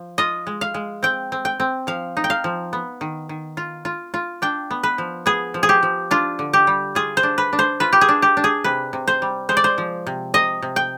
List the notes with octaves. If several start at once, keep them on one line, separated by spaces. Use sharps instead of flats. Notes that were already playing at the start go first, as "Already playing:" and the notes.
Already playing: F3
F4 D#5
G#3
F5
G#3
C4 G5
C4
G5
C4
F3 F5
D#4
G5
F5
F3
B3
D#3
D#3
F4
F4
F4
D4 G5
B3
B4
F3
B3 G#4
F3
G#4
G4
F3
D4 F4
D3
G4
G3
F4 G#4
C5
D4
B4
D4
C5
F4 B4
G4
G#4
D4
G4
D4
G#4
C3 B4
C3
C5
G3
G#3 C5
D5
C5
F3
C3
C3 D#5
C3
G5